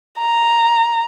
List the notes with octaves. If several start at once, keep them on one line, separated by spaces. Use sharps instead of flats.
A#5